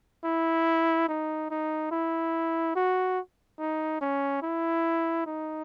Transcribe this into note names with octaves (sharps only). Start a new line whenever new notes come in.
E4
D#4
D#4
E4
F#4
D#4
C#4
E4
D#4